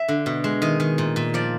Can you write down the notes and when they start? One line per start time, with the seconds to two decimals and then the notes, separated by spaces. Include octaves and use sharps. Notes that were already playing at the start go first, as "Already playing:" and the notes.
Already playing: E5
0.08 D3
0.26 B2
0.44 G#3
0.62 D#3 D#5
0.80 D#3
0.98 A#2
1.16 A#2
1.34 F3 D5